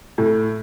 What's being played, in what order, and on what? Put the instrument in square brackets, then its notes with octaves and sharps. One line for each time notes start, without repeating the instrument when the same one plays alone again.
[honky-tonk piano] A2